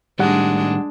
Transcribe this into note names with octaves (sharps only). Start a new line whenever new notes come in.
A2 D#3 G3 G#3 D4 F#5